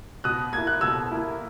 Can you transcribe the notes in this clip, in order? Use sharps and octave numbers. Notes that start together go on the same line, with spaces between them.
B2 D#6 F#6
A#3 E4 G#6
F#6
B2 E6 G#6
A#3 E4